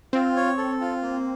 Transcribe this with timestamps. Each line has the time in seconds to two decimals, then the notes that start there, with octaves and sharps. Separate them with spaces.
0.13 C4 F4
0.36 C#5
0.58 A4
0.81 F4
1.02 A#3